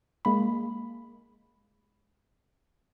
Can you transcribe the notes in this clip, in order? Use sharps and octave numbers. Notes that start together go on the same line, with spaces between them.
G#3 A#3 B5